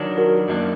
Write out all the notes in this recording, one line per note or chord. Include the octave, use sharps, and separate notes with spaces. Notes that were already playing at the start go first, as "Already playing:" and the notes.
Already playing: D#3 F#3 D4
F#4 A#4
F#2 D#3 A#3 D4